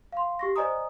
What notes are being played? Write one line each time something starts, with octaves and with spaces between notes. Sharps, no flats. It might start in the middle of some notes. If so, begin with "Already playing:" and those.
F5 C6
G4 C#6 A#6
C5 D5 D#5 G#5 A#5 D#6